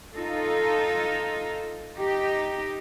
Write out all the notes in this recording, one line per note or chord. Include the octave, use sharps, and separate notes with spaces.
D#4 F4 A4
D#4 G4